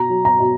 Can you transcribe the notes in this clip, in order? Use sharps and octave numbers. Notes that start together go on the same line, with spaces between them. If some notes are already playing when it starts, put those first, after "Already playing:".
Already playing: B2 A#5
F#3
A#5
B2